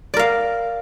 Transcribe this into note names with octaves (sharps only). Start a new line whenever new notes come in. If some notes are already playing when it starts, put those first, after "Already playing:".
A#4 D5 F5